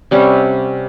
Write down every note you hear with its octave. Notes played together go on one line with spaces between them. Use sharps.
C3 G3 C#4 F#5